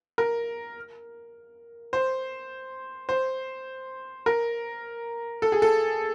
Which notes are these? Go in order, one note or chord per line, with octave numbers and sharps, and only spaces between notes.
A#4
C5
C5
A#4
A4
G#4
A4